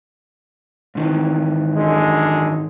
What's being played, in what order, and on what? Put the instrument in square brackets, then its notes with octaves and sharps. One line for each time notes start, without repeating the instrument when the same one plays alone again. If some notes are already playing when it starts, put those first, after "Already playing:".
[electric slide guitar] G#2 D#3 E3
[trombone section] F#2 D3 G#3